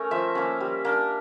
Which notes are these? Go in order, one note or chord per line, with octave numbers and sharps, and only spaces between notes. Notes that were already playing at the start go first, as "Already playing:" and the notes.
Already playing: A3 C#4 A#4
F3 E5
A#3 C#4
G3
A#3 D4